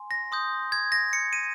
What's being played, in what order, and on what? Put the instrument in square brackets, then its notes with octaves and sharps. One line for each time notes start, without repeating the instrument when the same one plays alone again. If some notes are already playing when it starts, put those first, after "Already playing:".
Already playing: [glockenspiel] G#5 C6
A#6
C6 D#6 G6
G#6
A#6
C#7
D#7